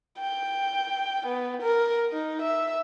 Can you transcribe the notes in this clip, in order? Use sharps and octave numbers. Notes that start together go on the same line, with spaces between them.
G5
B3
A#4
D#4
E5